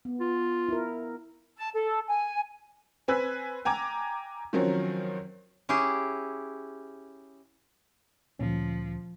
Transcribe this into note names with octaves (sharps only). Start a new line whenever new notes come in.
B3
F4
E4 A#4
A5
A4
G#5
C4 B4 G#5 E6 F#6 B6
G5 G#5 A#5 D6 G#6
D#3 F3 F#3 C4 C#4
C#4 E4 G4 G#4
D2 A#2 F3 C#4